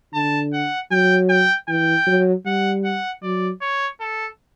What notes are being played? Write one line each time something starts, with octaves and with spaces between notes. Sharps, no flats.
D3 A5
F#5
F#3 G5
G5
E3 G5
F#3
G3 F#5
F#5
F#3 D5
C#5
A4